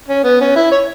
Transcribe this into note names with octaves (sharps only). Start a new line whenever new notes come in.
C#4
B3
C#4
E4
C#5